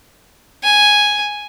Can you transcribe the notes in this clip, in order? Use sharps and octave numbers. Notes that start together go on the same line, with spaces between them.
G#5